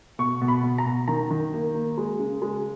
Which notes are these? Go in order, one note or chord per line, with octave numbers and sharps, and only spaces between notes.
B2 C#6
B2
B5
B2
A#5
B2
D#3 A#5
D#3
A#3
A#3
G#3
C#3
G#3